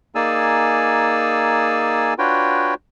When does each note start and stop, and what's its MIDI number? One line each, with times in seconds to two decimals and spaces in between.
0.15 2.14 58
0.15 2.14 63
0.15 2.14 68
0.15 2.14 74
0.15 2.14 80
0.15 2.14 88
2.19 2.74 62
2.19 2.74 65
2.19 2.74 66
2.19 2.74 71
2.19 2.74 73
2.19 2.74 79